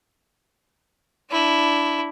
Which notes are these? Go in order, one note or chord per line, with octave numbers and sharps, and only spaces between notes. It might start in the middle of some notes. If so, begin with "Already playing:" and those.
D4 E4